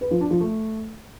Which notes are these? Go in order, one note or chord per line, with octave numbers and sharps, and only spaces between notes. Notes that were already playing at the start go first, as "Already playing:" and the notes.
B4
F3
D4
F3
A3